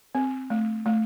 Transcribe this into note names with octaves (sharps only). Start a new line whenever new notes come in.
C4
A3
A3